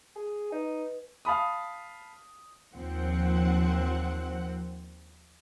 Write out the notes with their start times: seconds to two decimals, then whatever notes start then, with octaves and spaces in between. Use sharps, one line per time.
0.16 G#4
0.52 D#4 B4
1.25 F5 A5 B5 D#6
2.75 D#2 F3 C4 F#5